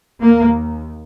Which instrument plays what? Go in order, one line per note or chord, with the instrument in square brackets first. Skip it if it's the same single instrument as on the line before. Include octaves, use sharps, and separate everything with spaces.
[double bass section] D#2 A#3